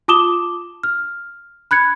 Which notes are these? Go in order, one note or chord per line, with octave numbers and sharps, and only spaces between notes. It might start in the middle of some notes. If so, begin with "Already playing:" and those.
F4 A5 D6 D#6 E7 G7
F6
B5 F#6 G#6 C#7